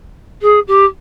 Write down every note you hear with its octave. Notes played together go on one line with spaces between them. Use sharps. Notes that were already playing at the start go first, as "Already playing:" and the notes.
G#4
G4